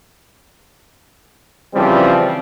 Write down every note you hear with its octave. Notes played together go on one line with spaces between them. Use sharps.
C#3 E3 F3 G3 C4